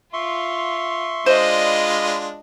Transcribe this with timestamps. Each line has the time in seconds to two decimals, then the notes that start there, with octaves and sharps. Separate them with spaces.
0.13 F4 E5 C6 C#6
1.26 G#3 D4 F4 C5 D5 D#5
1.65 B5